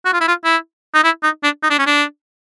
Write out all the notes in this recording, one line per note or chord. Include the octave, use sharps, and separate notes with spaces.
F#4
F4
E4
F4
E4
D#4
E4
D#4
D4
D#4
D4
C#4
D4